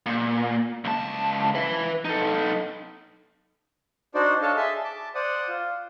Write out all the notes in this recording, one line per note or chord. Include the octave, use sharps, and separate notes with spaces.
A#2
C#2 A5
B4 E5
D#4 A4
D4 D#4 F#4 C5 D5
D4 A4 C#5 D#5 F5 A5
G#4 E5 A5 C6
A5 D6
C5 D5 F#5 D#6
F4